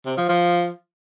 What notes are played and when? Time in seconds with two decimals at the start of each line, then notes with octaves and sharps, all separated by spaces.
0.06 C3
0.17 F3
0.29 F3